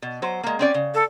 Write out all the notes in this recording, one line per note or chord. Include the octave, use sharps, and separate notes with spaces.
B2
F#3 C5
G#3 A#3
C4 C#4 D5
C#3
A4